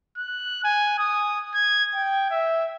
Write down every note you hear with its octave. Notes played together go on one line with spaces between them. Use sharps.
F#6
G#5
D#6
G#6
G5
E5